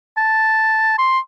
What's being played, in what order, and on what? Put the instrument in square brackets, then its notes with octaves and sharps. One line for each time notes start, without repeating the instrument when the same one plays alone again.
[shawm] A5
C6